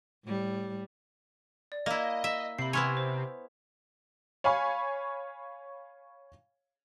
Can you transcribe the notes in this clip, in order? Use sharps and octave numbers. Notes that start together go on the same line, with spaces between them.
A2 G3
D5
A#3 E4 D#5
E5
C3 B5 C7
B3 E4 C#5 G#5 C6 F6
C5
C#5 F5 G#5 B5 C#6